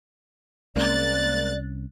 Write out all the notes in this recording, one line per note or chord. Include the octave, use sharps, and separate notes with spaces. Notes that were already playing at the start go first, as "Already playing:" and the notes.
C2 G#3 A#3 C4 C#4 D5 F#6 A6